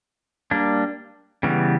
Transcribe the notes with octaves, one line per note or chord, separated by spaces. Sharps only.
G3 A#3 D4
C#3 E3 G3 B3